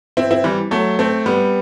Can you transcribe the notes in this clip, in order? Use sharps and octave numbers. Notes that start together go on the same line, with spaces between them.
C4 E4
C4 E4
E3 G3
F#3 A3
A3 C4
G3 B3